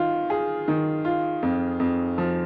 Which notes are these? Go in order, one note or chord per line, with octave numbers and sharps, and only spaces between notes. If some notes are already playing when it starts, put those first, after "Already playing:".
Already playing: D#3 F4
G#4
D#3
F4
F2
F2
F3